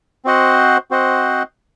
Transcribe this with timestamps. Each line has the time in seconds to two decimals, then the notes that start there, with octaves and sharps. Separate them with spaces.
0.25 C4 F#4 C5 D#5 F#5
0.91 C4 F#4 C5 D#5 F#5